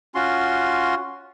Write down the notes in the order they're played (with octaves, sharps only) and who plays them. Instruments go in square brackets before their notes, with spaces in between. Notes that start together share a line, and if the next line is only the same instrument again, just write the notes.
[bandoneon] C#4 F4 F#4 C6